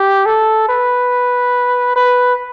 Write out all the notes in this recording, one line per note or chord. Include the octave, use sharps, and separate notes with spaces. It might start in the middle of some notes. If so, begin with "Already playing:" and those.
Already playing: G4
A4
B4
B4